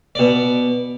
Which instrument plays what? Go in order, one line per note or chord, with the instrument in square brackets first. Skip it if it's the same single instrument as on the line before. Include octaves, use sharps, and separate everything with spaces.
[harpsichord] B2 D5